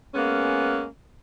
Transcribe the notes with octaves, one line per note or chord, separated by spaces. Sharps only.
G#3 A#3 B3 C#4